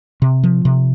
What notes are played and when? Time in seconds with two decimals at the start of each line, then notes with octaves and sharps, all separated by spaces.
0.22 C3
0.43 F3
0.65 C3